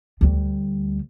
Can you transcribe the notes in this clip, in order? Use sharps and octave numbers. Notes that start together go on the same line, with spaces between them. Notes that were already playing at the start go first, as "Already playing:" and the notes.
D2 G3